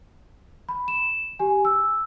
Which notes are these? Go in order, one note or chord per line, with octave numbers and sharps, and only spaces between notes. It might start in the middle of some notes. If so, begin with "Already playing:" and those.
B5
E7
G4 G#5
E6